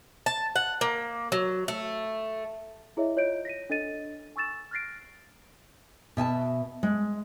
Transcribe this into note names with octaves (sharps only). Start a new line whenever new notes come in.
A5
F#5
A#3
F#3
A3
E4 G#4 C#5 D#5 E5
F4 C#5 D#5 G6 D7
A#6 B6 D#7
D4 A4 D#5 A6 D#7
G#5 C#6 E6 A6 E7
F6 F#6 A6 A#6 C7 D7
B2 E5 G#5 A5
G#3